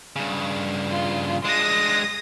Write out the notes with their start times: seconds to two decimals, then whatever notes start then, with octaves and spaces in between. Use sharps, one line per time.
0.16 G2 C#3
0.91 F4
1.45 G#3 D4 D#6 A#6